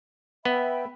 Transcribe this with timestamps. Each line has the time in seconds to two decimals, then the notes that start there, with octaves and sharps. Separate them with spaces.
0.45 B3 E5 G5 B5